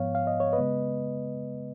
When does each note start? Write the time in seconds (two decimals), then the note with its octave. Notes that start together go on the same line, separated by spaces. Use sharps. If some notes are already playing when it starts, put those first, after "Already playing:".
Already playing: G#2 F3 B3 C#5 F5
0.15 F5
0.27 D#5
0.40 C#5
0.53 B4 D#5
0.58 C#3 G#3 B3